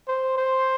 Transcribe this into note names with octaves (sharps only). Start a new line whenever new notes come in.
C5
C5